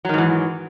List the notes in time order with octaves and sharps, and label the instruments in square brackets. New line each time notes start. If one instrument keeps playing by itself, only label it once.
[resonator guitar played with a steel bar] F#3
D#3
G#2
E3